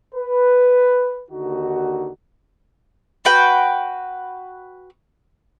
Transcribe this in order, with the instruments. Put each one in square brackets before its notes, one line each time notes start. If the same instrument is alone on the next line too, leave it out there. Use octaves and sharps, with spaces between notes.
[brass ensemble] B4
D#2 D3 D#4 F#4
[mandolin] F#4 B4 G5